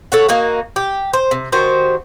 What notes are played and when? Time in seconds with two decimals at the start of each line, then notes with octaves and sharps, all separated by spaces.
0.12 A4 C#5 F#5
0.29 A#3 D#4 F#4
0.76 G4
1.13 C5
1.31 C3
1.52 D#3 F#4 G4 C5